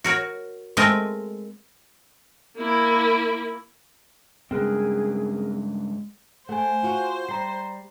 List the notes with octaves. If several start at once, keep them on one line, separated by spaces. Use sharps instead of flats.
F#4 A#4 C#5
G#3 A3 C4 A#4 D#5
A#3 E4
G2 C#3 G#3 C4 G#4 A#4 B4
A3 C5 F#5 G#5
F4 F#4
G3 A#5 C7